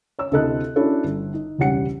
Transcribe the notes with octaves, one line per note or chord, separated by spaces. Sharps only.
C#5 E6
D2 C3 E4 A4 D#5 F#6
C#4 D4 E4 F#4 A4 C#5
G1
D#4
E1 C#2 G3 C#5 F#5 C#7